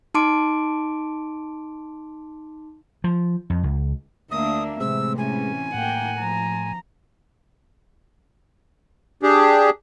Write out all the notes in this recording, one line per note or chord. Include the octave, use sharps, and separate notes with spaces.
D#4 A5 C6 D6 D7
F3
F2
C#2
D2 A#3 D4 E5 D#6
A2 C3 E3 G#3 C4 E6
G#3 C#4 G#5
A2 A#3 F#5 G5
F3 A#5
D4 G4 G#4